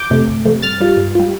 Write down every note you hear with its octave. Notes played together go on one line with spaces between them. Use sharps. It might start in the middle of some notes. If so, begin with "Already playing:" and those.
Already playing: D6 G6
F2 C3 A3
G1
F2 C3 A3
G2 F6 A6
G3 F4
G2
G3 F4